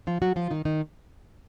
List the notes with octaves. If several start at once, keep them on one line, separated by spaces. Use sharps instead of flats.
F3 F4
F#3 F#4
F3 F4
D#3 D#4
D#3 D#4